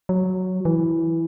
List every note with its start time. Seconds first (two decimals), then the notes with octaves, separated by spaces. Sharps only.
0.09 F#3
0.65 E3